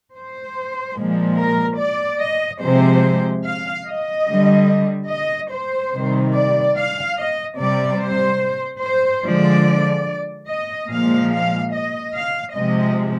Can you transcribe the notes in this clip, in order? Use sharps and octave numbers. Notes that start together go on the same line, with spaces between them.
C5
A#2 F3 G#3
A#4
D5
D#5
C3 F3 G#3 C5
F5
D#5
D3 G3
D#5
C5
C3 D#3 G3
D5
F5
D#5
C3 G3 D5
C5
C5
D3 F3 G#3 D5
D#5
A#2 F3 G#3 F5
F5
D#5
F5
C3 F3 G#3 D#5